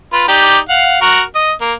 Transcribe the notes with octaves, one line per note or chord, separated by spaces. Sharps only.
F4 B4
D#4 G4 D5
F5 F#5
F#4 A#4
D#5
A#3